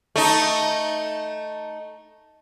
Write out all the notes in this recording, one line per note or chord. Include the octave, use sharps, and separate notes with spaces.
A3 D#4